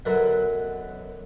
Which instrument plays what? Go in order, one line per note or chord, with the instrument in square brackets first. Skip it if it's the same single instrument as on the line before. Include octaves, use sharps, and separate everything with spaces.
[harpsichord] F#2 B2 D3 F#3